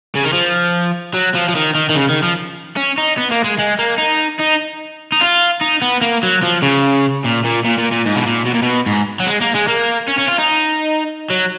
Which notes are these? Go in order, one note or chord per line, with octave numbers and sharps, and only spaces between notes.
C#3
D#3
F3
F#3
F3
F3
D#3
D#3
D#3
C#3
D#3
F3
C#4
D#4
B3
A#3
G#3
G#3
A#3
D#4
D#4
D#4
F4
D#4
B3
A#3
F#3
F3
C#3
A#2
A#2
A#2
A#2
A#2
G#2
B2
A#2
B2
A#2
B2
G#2
F#3
G#3
A#3
G#3
A#3
C#4
C#4
F4
D#4
F#3